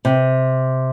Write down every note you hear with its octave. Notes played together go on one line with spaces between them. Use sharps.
C3